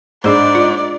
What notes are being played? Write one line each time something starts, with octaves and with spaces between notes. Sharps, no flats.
G#2 D4 G#4 C5 D5
F4